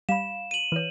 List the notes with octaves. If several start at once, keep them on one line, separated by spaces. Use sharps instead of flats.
G3 F5 B5 E7
D#7 F#7
E3 B4 C#5